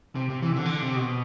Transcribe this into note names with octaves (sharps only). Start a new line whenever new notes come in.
C3
C3
E3
C3
D3
E3
D3
C3
B2